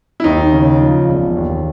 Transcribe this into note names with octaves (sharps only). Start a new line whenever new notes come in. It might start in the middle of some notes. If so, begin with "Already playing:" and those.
E4
D#2 D#4
C#3
F3
E1
D#2